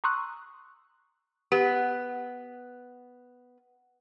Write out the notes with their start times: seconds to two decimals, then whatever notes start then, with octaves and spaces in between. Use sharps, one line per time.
0.04 A#5 C6 C#6 D#6 E6 F#6
1.52 B3 G4